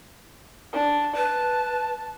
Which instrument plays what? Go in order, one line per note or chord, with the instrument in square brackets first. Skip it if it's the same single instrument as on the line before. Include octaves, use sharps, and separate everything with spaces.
[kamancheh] D4
[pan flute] B4 [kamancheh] A5